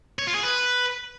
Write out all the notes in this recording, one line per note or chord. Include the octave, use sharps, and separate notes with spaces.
C#5
F4
G#4
B4